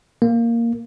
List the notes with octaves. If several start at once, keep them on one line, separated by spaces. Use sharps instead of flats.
A#3